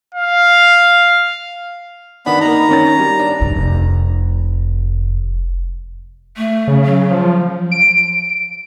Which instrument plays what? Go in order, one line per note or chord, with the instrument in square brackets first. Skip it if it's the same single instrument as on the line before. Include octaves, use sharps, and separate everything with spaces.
[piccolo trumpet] F5
[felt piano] D#3 D4 [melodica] B3 B5
[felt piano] A#3 D#4 [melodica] A#5
[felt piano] D#3 C#4 A6
G3
D4
[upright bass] F1 F4
[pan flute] A3
[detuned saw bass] C#3
[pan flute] F#3
[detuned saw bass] F3
[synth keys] D7